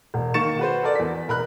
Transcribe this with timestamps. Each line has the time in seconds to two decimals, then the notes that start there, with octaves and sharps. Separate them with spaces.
0.14 E1
0.34 D#3 A#3 C#6 A6 C#7 E7
0.59 F#4 B4 C5
0.83 A4 A#4 D5
0.96 E2 B6
1.28 E1 A#4 B5 F#6